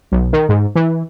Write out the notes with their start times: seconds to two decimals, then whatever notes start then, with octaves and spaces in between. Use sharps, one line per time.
0.12 B1
0.33 D#3
0.49 G#2
0.76 E3